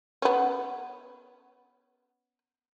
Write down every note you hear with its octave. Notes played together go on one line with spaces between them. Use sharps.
B3 C#4